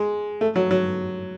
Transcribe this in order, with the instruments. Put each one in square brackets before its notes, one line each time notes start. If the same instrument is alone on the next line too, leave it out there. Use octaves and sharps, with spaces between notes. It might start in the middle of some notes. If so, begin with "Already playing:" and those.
Already playing: [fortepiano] G#3
A3
F#3
F#3